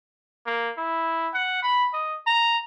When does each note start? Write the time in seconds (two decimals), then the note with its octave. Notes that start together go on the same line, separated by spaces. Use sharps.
0.46 A#3
0.77 E4
1.34 F#5
1.63 B5
1.93 D#5
2.27 A#5